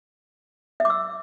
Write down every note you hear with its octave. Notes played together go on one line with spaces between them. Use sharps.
E5
D6
E6